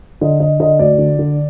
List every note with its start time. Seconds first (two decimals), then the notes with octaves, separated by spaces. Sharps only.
0.21 D3 D#5
0.40 D3 D#5
0.60 D3 D#5
0.79 D2 D5
0.98 D3
1.19 D3